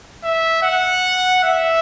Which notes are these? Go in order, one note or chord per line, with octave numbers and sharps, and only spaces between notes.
E5
F#5
E5